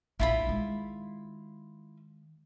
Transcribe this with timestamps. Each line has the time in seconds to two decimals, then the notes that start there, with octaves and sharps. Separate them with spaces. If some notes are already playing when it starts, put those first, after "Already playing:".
0.19 A#1 E4 F4 B5
0.47 D#3 G#3